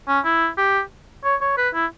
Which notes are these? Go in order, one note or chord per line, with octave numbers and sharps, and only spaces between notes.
C#4
E4
G4
C#5
C#5
B4
E4